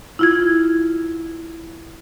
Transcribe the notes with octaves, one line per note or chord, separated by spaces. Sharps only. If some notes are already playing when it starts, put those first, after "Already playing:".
E4 F4 G#6